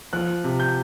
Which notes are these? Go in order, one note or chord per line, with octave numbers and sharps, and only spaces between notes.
F3 F#6
C3
G6